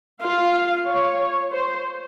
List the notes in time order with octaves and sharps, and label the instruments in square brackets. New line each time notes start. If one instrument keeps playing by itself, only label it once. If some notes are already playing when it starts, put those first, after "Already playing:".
[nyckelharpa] F4 [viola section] F5
[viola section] C#5
C5